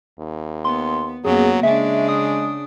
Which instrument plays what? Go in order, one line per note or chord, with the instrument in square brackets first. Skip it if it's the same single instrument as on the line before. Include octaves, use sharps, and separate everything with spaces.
[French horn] D#2
[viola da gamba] B3 [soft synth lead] C6
[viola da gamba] F#2 A#3 B3 [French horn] F#3 [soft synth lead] G#4
[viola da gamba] C#3 D4 [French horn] G#3 [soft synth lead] E5
[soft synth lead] D#6